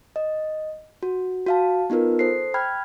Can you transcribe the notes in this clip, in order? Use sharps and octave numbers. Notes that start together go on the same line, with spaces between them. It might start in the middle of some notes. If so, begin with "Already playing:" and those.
D#5
F#4
F#4 F5 A5
B3 D#4 F4 A#4 B4
A4 C5 C7
G5 B5 F6 F#6 G#6